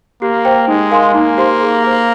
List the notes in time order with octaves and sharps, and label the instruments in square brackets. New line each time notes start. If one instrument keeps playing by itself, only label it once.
[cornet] A#3 [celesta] G4
[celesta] C5 G5
[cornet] G#3 [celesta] D#4
[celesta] A#4 F5 G#5 C6
[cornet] A#3 [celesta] D#4
[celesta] G4 C5 F5 C6
G#4
C5 F5